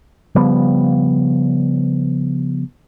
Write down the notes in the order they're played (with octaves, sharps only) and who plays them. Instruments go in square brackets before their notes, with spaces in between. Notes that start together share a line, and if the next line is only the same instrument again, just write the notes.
[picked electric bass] C#3 F3 G3 B3